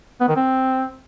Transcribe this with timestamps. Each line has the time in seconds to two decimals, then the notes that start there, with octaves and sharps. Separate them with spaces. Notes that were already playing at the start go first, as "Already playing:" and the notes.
0.21 B3
0.28 D#3
0.36 C4